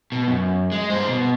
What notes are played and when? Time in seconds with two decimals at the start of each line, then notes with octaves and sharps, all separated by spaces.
0.12 B2
0.28 F#2
0.72 G#3
0.90 G2 C5
1.07 B2